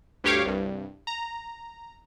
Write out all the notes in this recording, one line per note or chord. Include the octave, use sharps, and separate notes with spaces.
D2 G2 G4 C#5 F5 D6
C2 G2
A#5